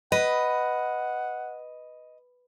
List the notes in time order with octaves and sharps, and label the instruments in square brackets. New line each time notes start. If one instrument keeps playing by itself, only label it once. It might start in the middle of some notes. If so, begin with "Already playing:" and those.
[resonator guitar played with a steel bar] B4 [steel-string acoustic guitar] D#5 [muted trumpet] F#5